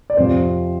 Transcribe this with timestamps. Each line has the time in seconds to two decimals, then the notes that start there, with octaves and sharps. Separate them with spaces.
0.10 D5
0.17 F2 C3 F3 C4 C5